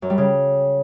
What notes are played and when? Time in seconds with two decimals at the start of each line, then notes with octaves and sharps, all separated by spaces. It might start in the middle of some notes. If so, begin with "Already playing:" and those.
0.02 F#2
0.10 G3
0.18 C#3